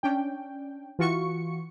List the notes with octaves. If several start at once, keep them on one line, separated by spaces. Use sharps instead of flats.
C#4 D4 G5
E3 F4 F#4 C#6 C#7